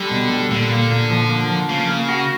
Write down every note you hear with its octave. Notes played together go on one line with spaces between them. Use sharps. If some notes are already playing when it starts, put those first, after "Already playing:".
Already playing: D3 G3
B2
G3
A#2 D3
A#3
A#2
F3
A#3
F3
C#3 A#3
A#3
F#4